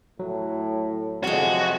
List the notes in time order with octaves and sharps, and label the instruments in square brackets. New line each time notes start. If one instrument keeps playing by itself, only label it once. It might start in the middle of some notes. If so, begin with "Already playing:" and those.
[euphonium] A2 [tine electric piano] F#3
[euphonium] F2 [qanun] C3 G#3 [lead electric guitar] F#4